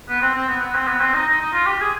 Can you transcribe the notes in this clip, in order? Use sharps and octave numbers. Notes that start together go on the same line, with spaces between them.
B3
C4
C4
B3
B3
C4
B3
C4
D#4
D#4
D#4
F4
G4
G#4